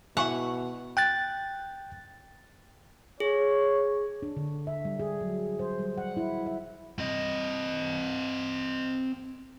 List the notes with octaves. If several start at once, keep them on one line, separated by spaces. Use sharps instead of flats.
B2 E3 E5 F#5 G#5 C#6
G5 F#6 A6
G#4 C#5
D4
D3
E5
G3
G#4
F#3
C5
G3
F#5
E4
E5
C4 D#5